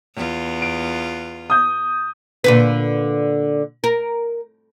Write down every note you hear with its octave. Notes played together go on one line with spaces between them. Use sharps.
E2 F4
D7
D#6 G6
A#2 D3 B4
A#4